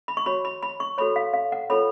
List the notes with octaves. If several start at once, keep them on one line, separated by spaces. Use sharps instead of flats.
B5
C#6
F#4 C#5 B5
B5
B5
C#6
F#4 A4 C#5 B5
F5
F5
F#5
F4 A4 C#5 B5